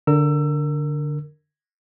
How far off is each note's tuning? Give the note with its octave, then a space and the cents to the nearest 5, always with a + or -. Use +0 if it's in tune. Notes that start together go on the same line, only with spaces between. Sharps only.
D3 +0 A#4 -15 E6 +20